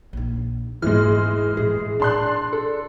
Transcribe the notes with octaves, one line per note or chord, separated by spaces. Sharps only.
A#1 D#4
E1 G#2 E3 G#3 F6
A2 G#4
B2 D4 C6 F#6
A4